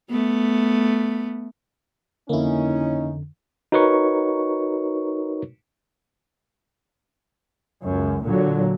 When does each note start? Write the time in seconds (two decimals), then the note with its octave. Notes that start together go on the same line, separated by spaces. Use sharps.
0.11 A3 B3
2.29 F2 D3 A#3 C#4 D#4 E4
3.72 D#4 F#4 A#4 B4 C#5 C#6
7.84 C#2 F#2
8.24 A#2 D3 F#3